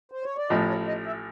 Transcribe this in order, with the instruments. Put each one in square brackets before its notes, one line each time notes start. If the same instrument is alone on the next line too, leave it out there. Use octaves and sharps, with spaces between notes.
[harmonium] C5
C#5
D5
[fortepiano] A1 A2 F3 [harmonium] D#5
[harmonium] C#5
D#5
E5